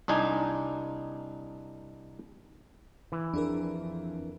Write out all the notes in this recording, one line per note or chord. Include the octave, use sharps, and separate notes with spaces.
C2 D4 D#4 G#5
E3
F2 D4 G#4 A#4